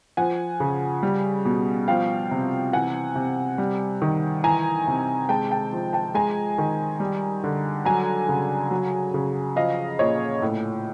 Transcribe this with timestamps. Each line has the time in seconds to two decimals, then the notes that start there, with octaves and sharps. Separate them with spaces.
0.17 F3 F#5 G#5
0.60 C#3
1.03 G3
1.45 B2
1.88 F3 F5 G5
2.31 C3
2.73 E3 F#5 G#5
3.16 C3
3.58 G3
4.02 D#3
4.44 E3 G#5 A#5
4.87 C3
5.29 G#3 G5 A5
5.51 G5 A5
5.73 F3
5.93 G5 A5
6.15 G#3 G#5 A#5
6.58 D#3
7.00 G3
7.44 D3
7.85 F#3 G#5 A#5
8.29 C#3
8.71 F#3
9.14 C#3
9.56 F3 D#5 F5
9.99 A#2 C#5 D#5
10.42 A2